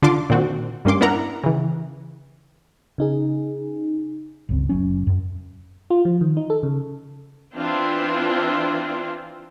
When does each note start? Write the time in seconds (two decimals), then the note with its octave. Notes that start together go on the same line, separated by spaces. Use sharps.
0.02 D3 D4 F4 A5 C6 D6
0.30 A#2 D#3 C4 F#4
0.85 G2 G3 A#3 C#4 C6 D6
1.01 B3 D4 E4 A#4 F#5 A#5
1.44 C#3 E3
2.98 C#3 D#4 G#4
4.49 G1 C#2 C4
4.69 F#1 F#3 C#4
5.07 F#2
5.90 F4
6.05 F3
6.21 D#3
6.37 D#4
6.50 A4
6.63 C#3
7.55 E3 C4 D4 F4 C5